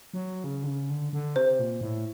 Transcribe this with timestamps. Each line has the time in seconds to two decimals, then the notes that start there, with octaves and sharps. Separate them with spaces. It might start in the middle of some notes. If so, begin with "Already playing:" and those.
0.14 F#3
0.44 C#3
0.63 D3
0.67 C#3
0.90 D3
1.13 D3
1.36 C3 C5
1.59 A#2
1.81 A2